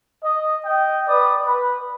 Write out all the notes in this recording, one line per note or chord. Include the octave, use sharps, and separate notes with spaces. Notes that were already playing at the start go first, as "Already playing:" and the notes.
D#5
D#5 G5
B4 D5 D#6
B4